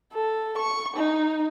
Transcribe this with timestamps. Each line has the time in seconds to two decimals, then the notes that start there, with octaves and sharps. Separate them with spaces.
0.13 A4
0.58 C#6
0.97 D#4